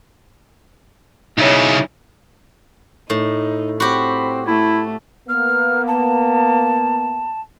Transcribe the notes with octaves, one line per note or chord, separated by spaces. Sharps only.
B1 C#3 D#4 E4 C#5
A2 D#4
C4 F#4 G4 B5
A3 E4
A#3 B3 F6
A5